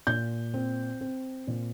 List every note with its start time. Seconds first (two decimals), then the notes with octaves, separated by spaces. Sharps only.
0.07 A#2 G6
0.54 C4
1.01 C4
1.47 A#2